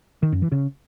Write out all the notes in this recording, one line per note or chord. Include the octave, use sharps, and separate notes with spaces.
D#3
F#2
E3
C#3